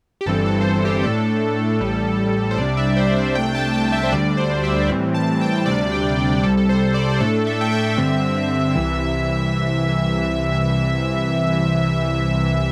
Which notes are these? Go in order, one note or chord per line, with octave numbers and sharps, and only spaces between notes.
G4
G1 G2 E3 C4 A4
A4
C5
A4
G4
A2 A3 D4 A4
A1 A2 G3
C5
C2 C3 G3 D4 D5
E5
C5
E5
C2 C3 A3 D4 G5
A5
G5
E5
C5
D2 D3 G3 D4 D5
C5
E5
A2 E3 G3 C4
A5
G5
D2 C3 G3 D4 D5
G5
C2 C3 G3 A4
A4
C5
D5
C5
A2 A3 D4 A4
E5
G5
E5
G2 D3 C4
C2 C3 E3